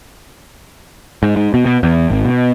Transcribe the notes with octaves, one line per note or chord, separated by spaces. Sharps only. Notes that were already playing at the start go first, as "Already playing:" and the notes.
G#2
G#2
B2
B2
E2
G#1
B2